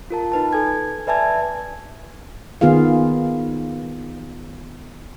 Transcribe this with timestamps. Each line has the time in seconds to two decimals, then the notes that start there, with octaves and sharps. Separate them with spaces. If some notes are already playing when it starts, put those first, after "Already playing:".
0.10 F4 A#4 A5
0.32 D#4 B4 A5
0.53 A4 G#5 G#6
1.07 B4 D5 E5 G#5 A5 G#6
2.61 D#3 B3 F4 G#4 F5